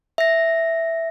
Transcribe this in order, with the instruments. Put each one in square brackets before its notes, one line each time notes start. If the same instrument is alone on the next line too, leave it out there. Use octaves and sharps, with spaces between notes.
[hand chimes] E5 A#6